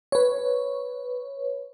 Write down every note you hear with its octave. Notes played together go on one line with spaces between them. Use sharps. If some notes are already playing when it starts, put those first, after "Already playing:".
B4 C#5